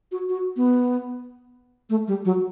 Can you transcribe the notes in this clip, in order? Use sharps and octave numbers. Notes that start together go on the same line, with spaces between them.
F#4
F#4
B3
A3
G3
F#3